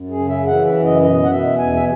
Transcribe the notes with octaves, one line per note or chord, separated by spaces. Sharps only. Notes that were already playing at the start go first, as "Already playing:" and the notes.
Already playing: F#2
G#4
C#3
E5
E3 F#5
E5
F#2
D#5
B2 D#5
F#5
B2 E5
E2 G#5
E5